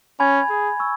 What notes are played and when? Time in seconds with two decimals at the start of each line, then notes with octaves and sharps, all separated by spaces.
0.20 C#4 G#5 B5 G#6
0.50 G#4
0.80 C#6 E6